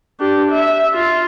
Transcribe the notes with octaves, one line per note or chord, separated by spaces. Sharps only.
D4 G4
E5
F4